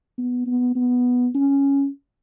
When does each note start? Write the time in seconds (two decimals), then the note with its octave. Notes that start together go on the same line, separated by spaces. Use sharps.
0.18 B3
0.47 B3
0.75 B3
1.35 C#4